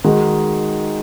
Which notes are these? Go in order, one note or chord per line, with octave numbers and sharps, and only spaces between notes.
D#3 G#3 D#4 F#4